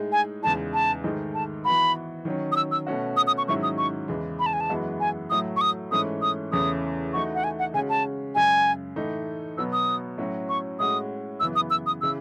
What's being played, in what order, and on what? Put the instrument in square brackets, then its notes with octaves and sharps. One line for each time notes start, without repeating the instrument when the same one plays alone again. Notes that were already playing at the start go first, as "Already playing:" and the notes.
Already playing: [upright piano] A2 G#3 D#4 G#4
[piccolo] G#5
[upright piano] E2 C#3 G#3 D#4 [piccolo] A5
[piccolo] A5
[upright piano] G#2 D#3 A3 D#4 G#4
[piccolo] A5
[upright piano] E3 B3 F#4 [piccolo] B5
[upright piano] D#3 F#3 C#4
[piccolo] D#6
E6
E6
[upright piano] B2 A3 C#4 F#4
[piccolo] D#6
D#6
C#6
[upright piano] G#2 D#3 F#3 C#4 E4 [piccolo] C#6
[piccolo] D#6
C#6
[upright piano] E2 C#3 E3 G#3
[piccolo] B5
A5
G#5
A5
[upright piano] F#2 E3 G#3 B3 F#4
[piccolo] G#5
[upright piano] A2 F#3 A3 [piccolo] D#6
[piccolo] C#6
D#6
[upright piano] G#2 E3 A3 C#4 [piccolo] D#6
[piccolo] D#6
[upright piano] E2 C#3 E3 A3 C#4 [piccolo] D#6
[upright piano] E3 A3 D#4 F#4 [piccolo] C#6
[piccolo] F#5
G#5
F#5
[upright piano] C#3 G#3 C#4 F#4 [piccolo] G#5
[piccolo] A5
[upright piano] F#2 C#3 G#3 [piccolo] G#5
[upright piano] A2 E3 A3 D#4
[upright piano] B2 F#3 B3 [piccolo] E6
[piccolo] D#6
[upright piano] A2 F#3 C#4 F#4
[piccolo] C#6
[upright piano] A2 G#3 C#4 F#4 [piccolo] D#6
[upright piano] F#2 C#3 E3 B3 [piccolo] E6
[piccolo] D#6
E6
D#6
[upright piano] C#3 E3 [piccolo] E6